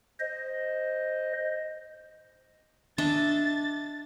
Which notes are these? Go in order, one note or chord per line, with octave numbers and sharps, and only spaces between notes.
C5 D#5
D4 D#5 E5 A6